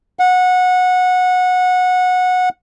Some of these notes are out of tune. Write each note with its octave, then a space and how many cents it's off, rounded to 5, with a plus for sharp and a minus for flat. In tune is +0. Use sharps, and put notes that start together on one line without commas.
F#5 -20